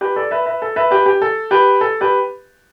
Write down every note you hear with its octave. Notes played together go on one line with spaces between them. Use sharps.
G4 B4
A4 D5
B4 E5
B4 E5
A4
B4 E5
G4 B4
G4
A4
G4 B4
A4
G4 B4